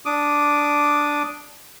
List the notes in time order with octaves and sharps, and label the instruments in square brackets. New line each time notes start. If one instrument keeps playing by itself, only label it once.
[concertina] D4 D6 D#6